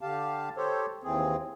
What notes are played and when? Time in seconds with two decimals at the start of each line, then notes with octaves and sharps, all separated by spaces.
0.01 D3 G4 F5 A5
0.57 G4 A4 C5 C#5
1.04 D#2 E3 C4 G#4